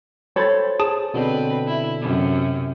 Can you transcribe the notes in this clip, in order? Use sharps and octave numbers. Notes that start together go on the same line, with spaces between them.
A4 C5 C#5 B5 A6
G#4 A5 D#6
B2 D3 C4 D4 B4
E4
F#2 C3